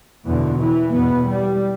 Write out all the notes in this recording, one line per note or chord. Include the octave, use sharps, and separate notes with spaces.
E2 B2 D3
E3
E2 B2 B3
G3